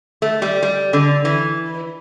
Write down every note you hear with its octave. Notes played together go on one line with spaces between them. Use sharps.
A3
G3
G3
D3
E3